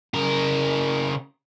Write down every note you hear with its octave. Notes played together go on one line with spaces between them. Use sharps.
C#3 A#4